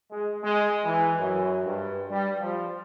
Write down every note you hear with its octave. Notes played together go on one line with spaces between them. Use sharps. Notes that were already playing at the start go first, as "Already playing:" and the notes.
G#3
G#3
E3
F#2
G2
G3
F3